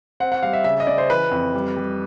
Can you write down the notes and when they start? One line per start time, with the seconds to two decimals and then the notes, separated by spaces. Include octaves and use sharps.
0.20 C4 F#5
0.32 F#5
0.43 G3 F5
0.53 E5
0.64 C#3 E5
0.80 D#5
0.87 C#3 D5
0.98 C5
1.10 E3 B4
1.31 F2
1.54 G3
1.77 G3